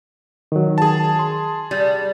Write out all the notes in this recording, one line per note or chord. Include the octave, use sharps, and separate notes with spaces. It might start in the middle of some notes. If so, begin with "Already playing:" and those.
D#3 F#3
G#4 A5
C6
G3